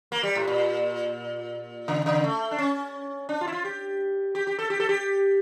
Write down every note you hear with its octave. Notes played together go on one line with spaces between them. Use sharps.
A#3
G3
A2
A#2
C#3
C#3
A3
D4
C#4
D4
F4
E4
F4
G4
G4
G4
A4
G4
A4
G4